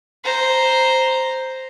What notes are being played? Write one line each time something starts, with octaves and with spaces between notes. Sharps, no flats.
C5 A#5